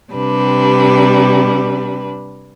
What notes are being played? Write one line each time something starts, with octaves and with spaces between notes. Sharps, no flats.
C3 G3 D4 B4